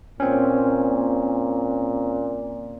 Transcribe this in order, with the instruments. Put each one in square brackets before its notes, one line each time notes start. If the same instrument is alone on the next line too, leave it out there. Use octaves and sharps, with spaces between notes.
[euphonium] A#2 [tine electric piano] C4 C#4